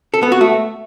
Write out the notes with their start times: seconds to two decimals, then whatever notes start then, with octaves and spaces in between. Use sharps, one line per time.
0.14 A4
0.23 B3
0.32 F#4
0.41 A3